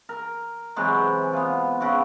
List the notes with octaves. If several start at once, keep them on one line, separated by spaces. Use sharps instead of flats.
A#4
C3 E3 F#3 G#3
B3 F4
C#3 E4 F#4